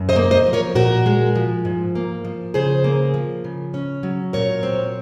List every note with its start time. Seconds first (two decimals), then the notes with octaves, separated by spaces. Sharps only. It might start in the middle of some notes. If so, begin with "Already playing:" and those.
Already playing: F#2
0.09 C5 D#5
0.16 A#3
0.31 C5 D#5
0.46 F3
0.53 A#4 C#5
0.75 A#2 F#4 A#4
1.06 G#3
1.35 F3
1.65 G#2
1.95 A#3
2.25 F3
2.54 C#3 G#4 C5
2.84 A#3
3.14 F3
3.44 C#3
3.74 C#4
4.03 F#3
4.33 A#2 A#4 C#5
4.63 C4